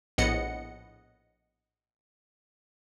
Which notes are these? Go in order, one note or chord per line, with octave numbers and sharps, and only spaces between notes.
A#1 A2 B3 D#5 F#5 C#7